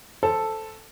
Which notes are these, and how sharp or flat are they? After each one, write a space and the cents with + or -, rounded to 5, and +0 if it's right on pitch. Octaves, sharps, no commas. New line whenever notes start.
A4 +0 C5 +0